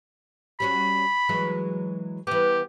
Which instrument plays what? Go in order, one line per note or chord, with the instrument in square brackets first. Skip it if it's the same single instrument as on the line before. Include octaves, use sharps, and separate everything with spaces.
[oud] G3 C#4 F#4 [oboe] B5
[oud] E3 F#3 G#3
[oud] E3 B3 [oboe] G4